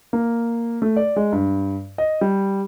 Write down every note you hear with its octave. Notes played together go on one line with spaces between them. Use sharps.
A#3
A3
D5
G#3
G2
D#5
G3